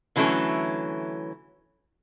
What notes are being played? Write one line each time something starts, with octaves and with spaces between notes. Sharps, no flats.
D3 E3 F#3 A3 C#4